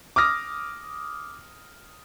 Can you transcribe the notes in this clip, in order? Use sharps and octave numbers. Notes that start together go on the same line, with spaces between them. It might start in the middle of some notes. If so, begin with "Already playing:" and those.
D6 D#6 F6 A#6